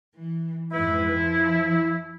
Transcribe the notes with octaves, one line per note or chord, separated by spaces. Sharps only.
E3
F2 G#2 E4 B4
F3